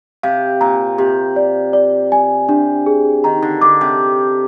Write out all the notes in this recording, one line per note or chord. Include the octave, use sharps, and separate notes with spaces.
C3 F5
A#2 A#5
C3 G4
D5
D5
G#5
C3 D4
G#4
D#3 A#5
D3
D3 D6
C3